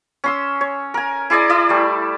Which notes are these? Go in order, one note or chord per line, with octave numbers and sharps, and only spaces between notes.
C#4 C6 E6
C#5
A#4 G#5
E4 G#4 D5 D#5
E4 D5 E5
G3 A3